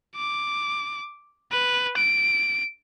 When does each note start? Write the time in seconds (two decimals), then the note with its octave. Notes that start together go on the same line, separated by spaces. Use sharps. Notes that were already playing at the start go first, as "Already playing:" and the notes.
0.17 D6
1.52 B4
1.97 D7